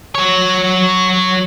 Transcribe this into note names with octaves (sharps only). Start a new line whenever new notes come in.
F#3 C#5